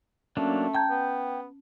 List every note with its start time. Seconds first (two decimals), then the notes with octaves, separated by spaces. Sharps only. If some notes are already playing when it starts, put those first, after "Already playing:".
0.37 F#3 A3 A#3 C#4 D4
0.74 G5 A5 A#5 G6 G#6
0.90 B3